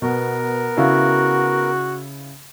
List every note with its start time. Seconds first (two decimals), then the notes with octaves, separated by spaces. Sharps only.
0.02 B2 B3 A#4
0.77 C#3 E4 F#4 F5